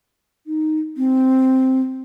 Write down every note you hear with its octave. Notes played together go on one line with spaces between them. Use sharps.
D#4
C4